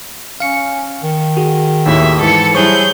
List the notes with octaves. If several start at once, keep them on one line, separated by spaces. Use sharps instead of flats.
C#4 F5 C#7
D#3
F#4 G#4
D#2 A2 E5
G#2 E3 A4 C#7
F#3 G3 E4 G#4 C5 C#6 G6